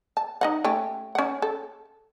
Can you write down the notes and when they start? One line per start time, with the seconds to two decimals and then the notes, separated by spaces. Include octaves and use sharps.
0.17 A5
0.41 D#4 D#5 F#5
0.64 A3 C#4 G4
1.15 C#4 F#5
1.42 A4